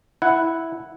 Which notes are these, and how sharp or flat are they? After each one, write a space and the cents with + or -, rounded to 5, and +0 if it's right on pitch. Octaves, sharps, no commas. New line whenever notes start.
E4 +0 F#5 +0